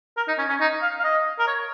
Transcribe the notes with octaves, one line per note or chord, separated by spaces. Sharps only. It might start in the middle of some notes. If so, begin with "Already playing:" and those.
A#4
D#4
C#4
C#4
D#4
F5
F5
D#5
A#4
C#5